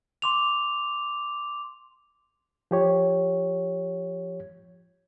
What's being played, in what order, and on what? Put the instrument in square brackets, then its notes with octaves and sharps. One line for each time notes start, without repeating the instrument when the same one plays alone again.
[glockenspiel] C6 D6 F7
[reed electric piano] F3 G4 C#5